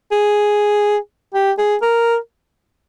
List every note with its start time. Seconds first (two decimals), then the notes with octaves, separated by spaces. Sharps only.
0.12 G#4
1.35 G4
1.58 G#4
1.82 A#4